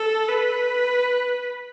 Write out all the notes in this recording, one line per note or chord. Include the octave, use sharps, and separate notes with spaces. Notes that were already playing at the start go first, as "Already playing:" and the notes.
Already playing: A4
B4